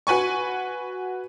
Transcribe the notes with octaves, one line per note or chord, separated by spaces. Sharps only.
F#4 B4 G#5 C#6